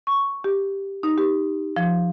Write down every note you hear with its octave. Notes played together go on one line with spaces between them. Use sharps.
C#6
G4
D#4
G4
F3